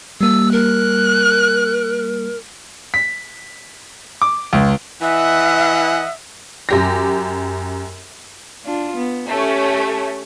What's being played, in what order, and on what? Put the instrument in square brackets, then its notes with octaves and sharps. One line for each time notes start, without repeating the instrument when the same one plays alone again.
[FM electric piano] G3 A#3 [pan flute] E6
[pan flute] A#4 [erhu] F#6
[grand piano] B6
D6
C#2
[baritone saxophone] E3 [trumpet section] D#5 F#5 [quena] E5
[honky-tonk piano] F#2 G4 A#6
[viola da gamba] D4 F4
B3
[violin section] A3 [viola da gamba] C#4 G4 C#5